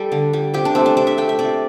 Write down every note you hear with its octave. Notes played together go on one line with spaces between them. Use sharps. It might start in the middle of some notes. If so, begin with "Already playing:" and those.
Already playing: G3 A4
D3
G3
C3 G4
D4
A3 C4
D4
C3 D4
E5
A3 G5
E5
C3 D5